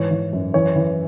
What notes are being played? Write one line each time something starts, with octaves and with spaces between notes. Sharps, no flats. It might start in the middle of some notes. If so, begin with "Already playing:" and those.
Already playing: G#2 E3 C#5
E3
F#2
E3 C#5
E3